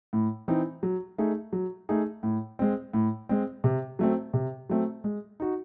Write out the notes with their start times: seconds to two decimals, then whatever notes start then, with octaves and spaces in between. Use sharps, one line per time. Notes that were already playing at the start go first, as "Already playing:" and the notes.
0.13 A2
0.48 E3 C4 D#4
0.83 F#3
1.18 A3 D#4 G#4
1.53 F#3
1.89 A3 D#4 G#4
2.23 A2
2.59 G#3 C4
2.93 A2
3.29 G#3 C4
3.64 C3
3.99 F#3 A3 C4
4.34 C3
4.69 F#3 A3 C4
5.04 G#3
5.40 D#4 F#4